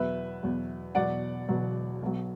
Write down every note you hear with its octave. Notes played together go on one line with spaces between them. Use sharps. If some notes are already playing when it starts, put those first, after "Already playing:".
Already playing: E2 B2 F#3 B4 E5
E2 B2 F#3
E1 E2 B2 F#3 D5 F#5
E1 E2 B2 F#3
B1 B2 F#3